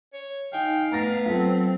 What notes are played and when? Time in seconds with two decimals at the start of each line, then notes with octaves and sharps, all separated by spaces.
0.13 C#5
0.53 D#4 D#5 F5 G5 G#5
0.92 A3 B3 A#5 A6 A#6
1.26 F#3 C4 F4 A4